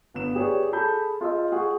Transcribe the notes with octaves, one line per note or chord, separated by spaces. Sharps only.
G1 B3 E7
G4 G#4 B4 C#5 D5
G#4 A4 B5 G6
F4 G#4 D#5 E6
G#4 F#5 C#6